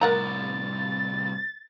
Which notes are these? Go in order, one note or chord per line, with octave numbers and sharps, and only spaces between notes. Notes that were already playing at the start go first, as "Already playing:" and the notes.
C2 A2 A#4 F#5 A#5 A6